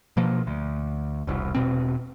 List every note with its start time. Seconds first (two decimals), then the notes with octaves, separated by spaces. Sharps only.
0.17 B2 F3 A#3
0.47 D2
1.27 E1 C2
1.55 E1 B2 C4